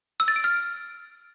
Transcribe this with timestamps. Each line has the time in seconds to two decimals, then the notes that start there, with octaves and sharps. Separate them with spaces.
0.20 E6
0.28 A6
0.36 D7
0.44 F6